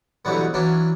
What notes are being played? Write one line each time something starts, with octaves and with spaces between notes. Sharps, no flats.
B2 D3 E3 F#3 G3 B3
E3 F#3 C#4 D4